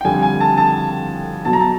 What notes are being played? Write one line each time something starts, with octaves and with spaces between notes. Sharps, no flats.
G5
F2 D3 G3 G#5
G#5
A5
A5
B2 F#3 A5
A#5
A5